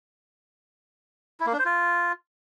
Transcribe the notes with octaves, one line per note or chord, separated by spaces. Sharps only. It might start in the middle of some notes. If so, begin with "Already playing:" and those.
E4
A#3
D4
C5
F4